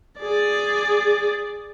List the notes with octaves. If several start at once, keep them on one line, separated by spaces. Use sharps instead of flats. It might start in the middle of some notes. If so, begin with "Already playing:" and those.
G#4 D5